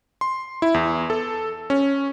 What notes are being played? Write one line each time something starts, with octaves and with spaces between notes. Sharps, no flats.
C6
E4
E2
A4
C#4